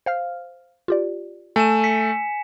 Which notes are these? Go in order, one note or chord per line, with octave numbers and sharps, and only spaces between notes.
C5 F5 F6
F4 G4 D5
A3 G#5 E7
B6 C#7